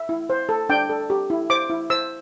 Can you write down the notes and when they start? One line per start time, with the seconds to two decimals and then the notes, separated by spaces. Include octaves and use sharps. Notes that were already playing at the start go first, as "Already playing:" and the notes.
Already playing: E5
0.09 E4
0.30 C5
0.49 A4
0.69 D4 G5
0.89 A4
1.10 G4
1.30 E4
1.50 C5 D6
1.70 E4
1.90 C5 E6